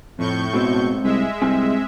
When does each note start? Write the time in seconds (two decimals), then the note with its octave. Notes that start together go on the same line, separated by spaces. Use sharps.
0.18 F2 A2 C#6 G6
0.53 G#2 B2 C4
1.04 C2 G#3 E5
1.42 C2 C4 G#5